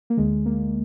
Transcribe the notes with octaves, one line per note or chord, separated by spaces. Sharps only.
A#3
D2 D3 G#3
A#3